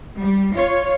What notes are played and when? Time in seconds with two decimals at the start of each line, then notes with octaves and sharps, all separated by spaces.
0.19 G3
0.55 F4 C#5